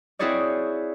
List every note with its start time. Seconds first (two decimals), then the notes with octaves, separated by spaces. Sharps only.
0.19 C4 E4 F#4 G#4 C#5 D5